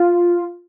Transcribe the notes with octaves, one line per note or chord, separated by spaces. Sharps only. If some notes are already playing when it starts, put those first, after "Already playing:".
Already playing: F4